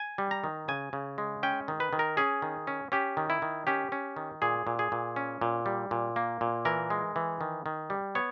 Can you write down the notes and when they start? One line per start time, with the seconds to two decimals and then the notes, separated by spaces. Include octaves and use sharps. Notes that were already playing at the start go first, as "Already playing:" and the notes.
Already playing: G#5
0.18 G3
0.31 A#5
0.44 D#3
0.68 C#3 G#5
0.93 C#3
1.18 G#3
1.43 C#4 G5
1.68 D#3
1.80 B4
1.93 D#3
1.99 A#4
2.17 C#4 G#4
2.42 D#3
2.67 C#4
2.92 C#4 G4
3.17 D#3
3.30 E4
3.42 D#3
3.67 C#4 G4
3.92 C#4
4.16 D#3
4.42 A#2 G#4
4.67 A#2
4.79 G#4
4.92 A#2
5.16 C#4
5.41 A#2
5.66 G3
5.91 A#2
6.16 A#3
6.41 A#2
6.65 E3 A#4
6.90 G#3
7.16 E3
7.41 D#3
7.66 D#3
7.90 G3
8.15 B3 C#5